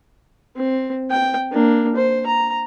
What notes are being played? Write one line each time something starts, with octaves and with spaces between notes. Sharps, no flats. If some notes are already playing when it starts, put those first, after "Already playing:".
C4
G5
A#3 D4
C5
A#5